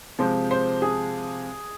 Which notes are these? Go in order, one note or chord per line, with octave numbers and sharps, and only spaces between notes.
C3 F3 G#3 C5
C5
G#4